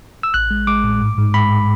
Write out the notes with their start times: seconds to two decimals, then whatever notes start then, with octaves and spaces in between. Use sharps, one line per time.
0.23 E6
0.34 A1 F#6
0.51 G#3
0.67 G#3 D6
0.84 A2
1.01 G#2
1.18 G#2
1.34 G#3 B5